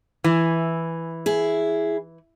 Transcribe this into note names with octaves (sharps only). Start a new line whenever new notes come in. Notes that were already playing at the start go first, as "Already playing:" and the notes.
E3 G#5
E4 G#4